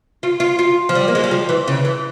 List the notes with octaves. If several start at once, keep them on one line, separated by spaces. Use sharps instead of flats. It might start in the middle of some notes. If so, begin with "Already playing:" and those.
F4
F4
F4
F3
G3
A#3
G#3
G3
F3
E3
C#3
E3